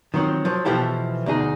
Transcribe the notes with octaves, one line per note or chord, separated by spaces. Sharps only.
D#3 F3 F#3 C4
F3 F#3
B2 E3 F3 E4 G4 A4
D2 B2 D#4 G#4